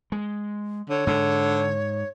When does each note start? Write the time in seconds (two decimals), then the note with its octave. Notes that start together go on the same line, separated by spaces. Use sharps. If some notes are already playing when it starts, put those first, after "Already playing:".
0.12 G#3
0.89 D3 C#5
1.07 G#2 D3